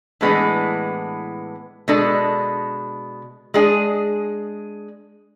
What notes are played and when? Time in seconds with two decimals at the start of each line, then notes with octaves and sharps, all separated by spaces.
0.21 A2 E3 G#3 B3 D4
1.88 B2 G#3 D4 A4
3.54 G#3 D4 G#4